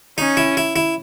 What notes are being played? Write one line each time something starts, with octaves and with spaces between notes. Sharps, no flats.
C#4 D#4
E4
E4
E4